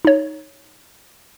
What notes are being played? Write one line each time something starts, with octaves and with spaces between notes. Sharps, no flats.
D#4 C#5